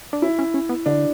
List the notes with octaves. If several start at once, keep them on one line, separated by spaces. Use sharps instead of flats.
D4
C#4 E4
C#4
C#4
B3
D3 D4